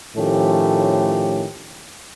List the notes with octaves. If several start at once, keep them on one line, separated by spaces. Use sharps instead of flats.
A2 D#3 F3 A3 C#4 G4